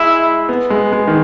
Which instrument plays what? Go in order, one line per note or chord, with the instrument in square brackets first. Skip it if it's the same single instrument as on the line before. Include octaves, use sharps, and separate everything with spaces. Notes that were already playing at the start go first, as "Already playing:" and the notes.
Already playing: [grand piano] G#3 [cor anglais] E4
[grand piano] B3
G#3
G#3
D#3